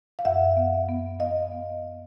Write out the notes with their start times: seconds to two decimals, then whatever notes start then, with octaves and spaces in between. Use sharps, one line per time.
0.19 F5
0.25 F#2 E5 F#5
0.57 B3
0.88 B3
1.20 B3 D#5 F5
1.52 B3